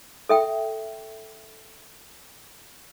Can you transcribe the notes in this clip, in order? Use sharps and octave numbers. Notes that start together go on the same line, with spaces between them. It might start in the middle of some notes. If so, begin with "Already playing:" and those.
A4 E5 G5